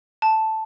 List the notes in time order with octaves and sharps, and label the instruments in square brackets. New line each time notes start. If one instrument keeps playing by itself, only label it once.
[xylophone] A5